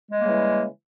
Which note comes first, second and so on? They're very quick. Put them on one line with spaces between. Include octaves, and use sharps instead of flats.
G#3 G3 A#3 C#3 E3